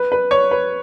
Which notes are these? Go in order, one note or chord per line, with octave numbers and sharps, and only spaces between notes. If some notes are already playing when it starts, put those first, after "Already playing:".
Already playing: B4
B4
C#5
B4